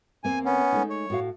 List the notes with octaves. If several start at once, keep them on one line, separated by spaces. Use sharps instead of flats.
E2 A#3 C4 G#5
B3 C#4
G#3 A3 D#4
C#5
A2 F#4 F5